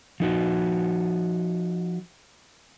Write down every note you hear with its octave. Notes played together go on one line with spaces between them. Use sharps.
F3 D#4 F#4